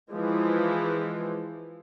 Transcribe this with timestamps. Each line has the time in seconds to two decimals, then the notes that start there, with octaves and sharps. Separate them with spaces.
0.12 E3 F3 G#3